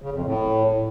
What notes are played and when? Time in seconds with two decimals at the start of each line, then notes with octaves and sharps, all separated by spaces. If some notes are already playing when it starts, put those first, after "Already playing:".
0.02 C#3
0.14 F2
0.25 A2